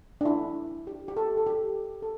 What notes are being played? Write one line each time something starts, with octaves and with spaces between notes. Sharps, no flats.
D4
E4
G4
G4
A4
A4
G4
A4